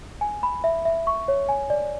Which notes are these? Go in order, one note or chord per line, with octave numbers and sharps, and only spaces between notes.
G#5
B5
E5
E5
C#6
C#5
G#5
D5